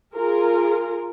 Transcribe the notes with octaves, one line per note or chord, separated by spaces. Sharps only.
F4 G#4 A#4